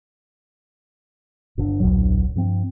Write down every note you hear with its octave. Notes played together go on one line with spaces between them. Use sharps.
G1 D3 D4
D1 A#1 F#2 F#3
G2 F3 C4